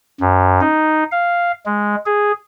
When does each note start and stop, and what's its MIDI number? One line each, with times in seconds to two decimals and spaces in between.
0.21 0.60 42
0.61 1.04 63
1.12 1.52 77
1.66 1.96 56
2.06 2.32 68